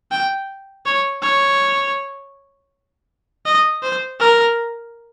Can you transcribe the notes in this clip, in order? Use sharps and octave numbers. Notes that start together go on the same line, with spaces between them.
G5
C#5
C#5
D#5
C5
A#4